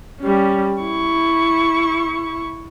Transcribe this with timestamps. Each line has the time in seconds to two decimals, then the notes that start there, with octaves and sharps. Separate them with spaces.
0.20 G3 C#4
0.82 E4 C#6